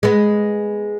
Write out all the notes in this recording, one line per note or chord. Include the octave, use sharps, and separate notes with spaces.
G#3 B3